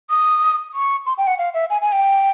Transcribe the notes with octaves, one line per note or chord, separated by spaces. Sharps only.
D#6
C#6
C6
G5
F#5
F5
E5
G#5
G#5
G5